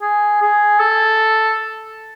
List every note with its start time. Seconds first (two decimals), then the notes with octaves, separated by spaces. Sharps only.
0.02 G#4
0.42 G#4
0.79 A4